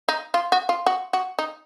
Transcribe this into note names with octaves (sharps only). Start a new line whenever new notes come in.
D#4
F4
F#4
F4
F#4
F#4
D#4